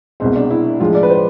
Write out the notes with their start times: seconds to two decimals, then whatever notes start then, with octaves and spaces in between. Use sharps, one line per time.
0.20 C2 B2 G#3 C4
0.36 D4
0.50 E4
0.80 A2 F3 G#3 F4
0.95 D5
1.03 B4
1.10 C5